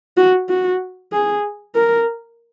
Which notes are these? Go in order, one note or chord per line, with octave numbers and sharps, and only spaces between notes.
F#4
F#4
G#4
A#4